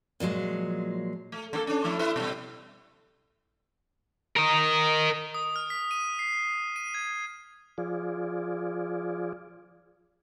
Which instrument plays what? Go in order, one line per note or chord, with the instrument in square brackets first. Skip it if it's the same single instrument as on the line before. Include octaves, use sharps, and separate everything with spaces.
[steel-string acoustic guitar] A#2 F3 F#3 G#3
[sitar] A3
D3 A#3 A4
C#4 D4
F3 A3 E4
E4 B4 E5
B2 G3
[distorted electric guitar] A#4 D#5
[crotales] D#6
F6
B6
D#7
C7
D#7
G#6
[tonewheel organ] F3 F4 G#4 D5